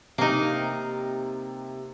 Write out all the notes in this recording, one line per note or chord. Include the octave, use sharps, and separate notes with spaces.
C3 A#3 D#4